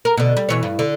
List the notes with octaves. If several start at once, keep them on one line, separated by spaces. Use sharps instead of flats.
A#4
B2 D3
G3
B2 E3 C#5
G2
D3